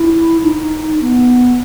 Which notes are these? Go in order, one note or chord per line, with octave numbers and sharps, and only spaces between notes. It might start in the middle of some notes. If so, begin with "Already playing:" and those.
Already playing: E4
D#4
B3